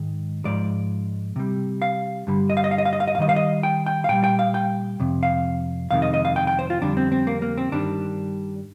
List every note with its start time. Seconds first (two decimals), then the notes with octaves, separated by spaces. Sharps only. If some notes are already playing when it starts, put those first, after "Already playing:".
Already playing: G#2 D#3 G#3
0.45 G#2 F3 G#3 D5
1.36 C3 G3
1.82 F5
2.27 G2 D3 G3
2.50 D#5
2.57 F5
2.64 D#5
2.71 F5
2.78 D#5
2.85 F5
2.93 D#5
3.00 F5
3.08 D#5
3.15 F5
3.18 C3 D#3 G3 D#5
3.29 F5
3.36 D#5
3.63 G5
3.86 G5
4.04 F5
4.09 A#2 G3 G5
4.24 G5
4.39 F5
4.54 G5
5.00 F2 C3
5.23 F5
5.91 F2 C3 D#3 G#3 F5
6.02 D#5
6.14 D#5
6.25 F5
6.36 G5
6.47 G5
6.59 C5
6.70 F4
6.82 F2 D3 G3 D4
6.97 C4
7.12 C4
7.27 A#3
7.42 A#3
7.58 C4
7.72 G2 D#3 G3 D4